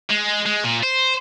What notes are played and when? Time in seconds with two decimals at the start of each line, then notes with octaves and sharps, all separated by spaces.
0.11 G#3
0.46 G#3
0.64 A#2
0.83 C5